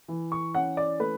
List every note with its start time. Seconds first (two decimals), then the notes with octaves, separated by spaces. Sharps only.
0.08 E3
0.32 C#6
0.55 C#4 F#5
0.77 D5
1.00 A3 B4